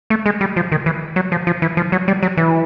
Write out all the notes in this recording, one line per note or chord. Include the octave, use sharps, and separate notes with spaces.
A3
G#3
G3
F3
D#3
E3
F#3
F3
F3
E3
F3
F#3
G3
F#3
E3